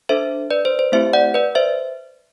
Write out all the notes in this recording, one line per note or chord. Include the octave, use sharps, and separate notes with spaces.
D4 A4 C5 E5
B4 D5
C5
C5
A3 C4 E4 G4 C5 E5
D5 F#5
B4 D5
C5 E5